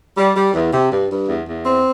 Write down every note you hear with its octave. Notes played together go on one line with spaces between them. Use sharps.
G3
G3
E2
C3
G2
G2
E2
E2
C4